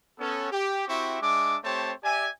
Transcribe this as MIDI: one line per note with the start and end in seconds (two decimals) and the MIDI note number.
0.19 0.50 59
0.19 0.50 61
0.19 0.50 69
0.51 0.87 67
0.88 1.18 60
0.88 1.18 64
0.88 1.18 66
0.88 1.18 67
0.88 1.18 76
0.88 1.18 85
1.21 1.57 56
1.21 1.57 62
1.21 1.57 76
1.21 1.57 86
1.64 1.92 57
1.64 1.92 60
1.64 1.92 67
1.64 1.92 72
1.64 1.92 73
1.64 1.92 81
2.03 2.28 67
2.03 2.28 74
2.03 2.28 76
2.03 2.28 80